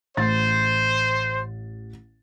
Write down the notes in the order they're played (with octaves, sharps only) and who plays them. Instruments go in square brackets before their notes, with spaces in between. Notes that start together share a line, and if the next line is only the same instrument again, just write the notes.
[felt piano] A1 A6 [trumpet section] C5